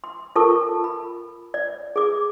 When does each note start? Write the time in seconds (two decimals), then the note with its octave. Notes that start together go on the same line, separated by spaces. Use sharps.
0.04 C6
0.36 F4 A4 A#4 A5 C#6
0.84 B5
1.54 D5
1.96 G#4 D6